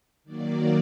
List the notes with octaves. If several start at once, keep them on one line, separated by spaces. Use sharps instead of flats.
D#3 F#3 A#3 D5